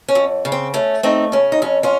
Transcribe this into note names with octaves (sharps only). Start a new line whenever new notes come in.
C#4
F2
C#3
C4
A3 C#4
A3 C4 D#4
C#3 C#4
D#4
F2 C#4
C#4 F4